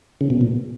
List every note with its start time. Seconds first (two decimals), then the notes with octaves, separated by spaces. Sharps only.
0.21 C#3
0.30 B2
0.41 A#2